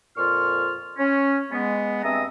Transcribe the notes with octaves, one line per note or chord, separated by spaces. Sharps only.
F2 A#2 F4 C#6 F6
C#4
G#3 B3
G2 G#3 C4 E5 A#5 D#6